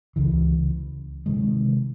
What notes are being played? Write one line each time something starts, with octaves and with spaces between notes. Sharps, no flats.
C#2 C#3 E3
C3 D#3 G#3